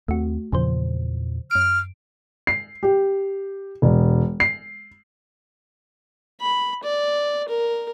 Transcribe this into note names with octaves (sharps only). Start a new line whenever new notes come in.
D#2 A3 C4 F#4
E2 A#2 C#3 F3 C5
F#2 F6 D7
C7
G4
E1
C7
B5
D5
A#4